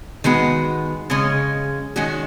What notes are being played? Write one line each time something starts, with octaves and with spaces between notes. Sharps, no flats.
D#3 G#3 B3 F#4
C#3 G#3 C#4
D#3 G#3 C#4 F#4